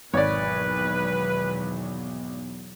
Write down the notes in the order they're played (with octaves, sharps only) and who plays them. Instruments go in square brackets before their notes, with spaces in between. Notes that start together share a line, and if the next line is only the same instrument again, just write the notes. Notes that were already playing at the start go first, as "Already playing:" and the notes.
[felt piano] G#1 [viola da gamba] E2 B2 F#3 [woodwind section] B4 [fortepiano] C#5 D5